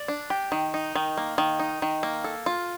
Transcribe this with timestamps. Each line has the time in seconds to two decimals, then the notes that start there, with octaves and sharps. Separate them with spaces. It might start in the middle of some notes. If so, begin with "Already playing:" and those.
Already playing: D5
0.08 D4
0.30 G4
0.52 D#3
0.74 D#4
0.95 D#3
1.17 A#3
1.38 D#3
1.59 D#4
1.82 D#3
2.03 A#3
2.24 A4
2.46 F4